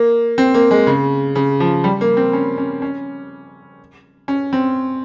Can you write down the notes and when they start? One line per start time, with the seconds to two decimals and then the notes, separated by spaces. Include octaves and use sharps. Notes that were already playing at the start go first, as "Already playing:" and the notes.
Already playing: A#3
0.38 C4
0.54 A#3
0.71 G#3
0.87 C#3
1.35 C#3
1.60 F3
1.84 G3
2.01 A#3
2.17 C4
2.33 C#4
2.58 C#4
2.82 C#4
4.28 C#4
4.53 C4